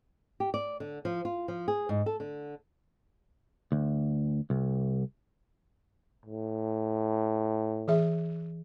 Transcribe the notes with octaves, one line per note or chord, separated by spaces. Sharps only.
G4
D5
D3
F3
F4
F3
G#4
G#2
A4
D3
D2
C2
A2
E3 G#4 E5